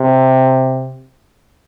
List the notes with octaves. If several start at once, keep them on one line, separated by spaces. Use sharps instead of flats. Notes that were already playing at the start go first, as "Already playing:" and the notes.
Already playing: C3